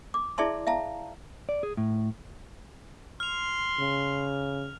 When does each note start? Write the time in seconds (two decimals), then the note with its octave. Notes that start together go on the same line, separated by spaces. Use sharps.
0.14 D6
0.38 E4 G#4 D5 E5 A5 C6
0.67 E5 F5 A5 A#5
1.49 D5
1.63 G#4
1.77 A2
3.20 C6 F6 F7
3.79 C#3